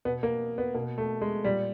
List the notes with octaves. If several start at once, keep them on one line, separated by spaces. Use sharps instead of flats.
B2 B3
A#3
B3
B2 A#3
A3
G#3
A#2 G3